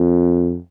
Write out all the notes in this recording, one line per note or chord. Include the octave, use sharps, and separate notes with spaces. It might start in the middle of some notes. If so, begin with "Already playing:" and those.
Already playing: F2